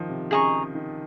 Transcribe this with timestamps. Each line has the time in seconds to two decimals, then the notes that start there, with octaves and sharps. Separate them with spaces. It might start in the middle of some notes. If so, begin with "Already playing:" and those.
Already playing: D#3 F3
0.09 C3
0.31 C#3 G#4 D#5 A#5 C#6
0.75 D#3